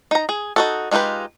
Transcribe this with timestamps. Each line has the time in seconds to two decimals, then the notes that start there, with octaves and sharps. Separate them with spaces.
0.11 D#4 A#5
0.29 G#4
0.56 D#4 F#4 A4
0.91 G#3 D#4 F4 G4 B4